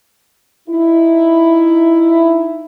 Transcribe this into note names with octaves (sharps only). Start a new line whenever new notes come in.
D#4 E4